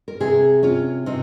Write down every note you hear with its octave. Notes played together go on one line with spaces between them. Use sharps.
A#4
C3 G#4
C#4 F4
C3 D#4